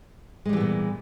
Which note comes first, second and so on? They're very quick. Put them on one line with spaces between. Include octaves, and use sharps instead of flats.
G#3 G3 E3 B3 A#2